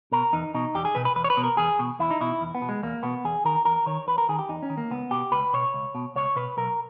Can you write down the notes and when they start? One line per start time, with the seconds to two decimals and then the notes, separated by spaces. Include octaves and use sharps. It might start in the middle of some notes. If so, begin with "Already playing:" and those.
0.12 B2 A#4
0.33 E2 D#4
0.54 B2 D#4
0.75 E2 G4
0.85 G#4
0.95 B2 B4
1.05 B4
1.16 E2 B4
1.24 C#5
1.30 B4
1.37 B2
1.44 A#4
1.57 E2 G#4
1.79 B2
1.99 E2 E4
2.11 D#4
2.21 B2 E4
2.41 E2
2.55 B3
2.62 B2
2.69 G#3
2.83 E2 A#3
3.03 B2 B3
3.24 E2 G#4
3.45 D#3 A#4
3.65 E2 A#4
3.86 D#3 C#5
4.07 E2 B4
4.18 A#4
4.29 D#3 G#4
4.39 G4
4.49 E2 D#4
4.63 C#4
4.70 D#3
4.77 A#3
4.91 C#2 B3
5.11 B2 G4
5.32 C#2 B4
5.53 B2 C#5
5.74 C#2
5.95 B2
6.15 C#2 C#5
6.36 B2 B4
6.57 B1 A#4